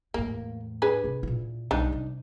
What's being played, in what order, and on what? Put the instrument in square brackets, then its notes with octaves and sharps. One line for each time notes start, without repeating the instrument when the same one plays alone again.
[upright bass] E2 A2 [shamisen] A#3
[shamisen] D4 G#4 B4
[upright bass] C3 C4
A#2 E4
[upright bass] B1 G3 [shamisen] D4 D#4
[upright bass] C3